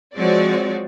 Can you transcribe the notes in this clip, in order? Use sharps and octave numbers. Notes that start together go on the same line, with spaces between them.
F3 G#3 C4 F#4 C#5 D5